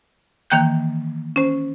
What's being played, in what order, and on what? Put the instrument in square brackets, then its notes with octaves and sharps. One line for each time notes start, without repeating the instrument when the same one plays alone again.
[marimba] D#3 E3 A#3 G5 F#6 G6
C#4 C5